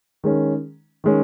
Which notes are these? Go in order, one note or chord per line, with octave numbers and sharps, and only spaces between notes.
D#3 G#3 C#4
D#3 G#3 C#4